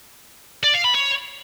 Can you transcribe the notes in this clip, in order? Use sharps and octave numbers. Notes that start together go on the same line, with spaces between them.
D5
F5
B5
C#5